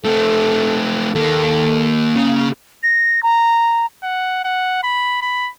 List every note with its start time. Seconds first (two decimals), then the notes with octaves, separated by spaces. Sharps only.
0.05 A3 C4 A4
1.15 D#2 A#3 A4
2.16 C#3 A#3
2.83 A#6
3.23 A#5
4.03 F#5
4.44 F#5
4.83 B5
5.22 B5